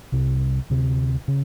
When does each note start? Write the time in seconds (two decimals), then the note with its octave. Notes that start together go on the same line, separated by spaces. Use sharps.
0.12 C2 C3
0.70 D2 C3
1.28 C#3